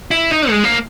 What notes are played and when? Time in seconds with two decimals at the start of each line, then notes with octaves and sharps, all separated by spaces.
0.11 E4
0.31 D#4
0.50 G#3
0.64 A#3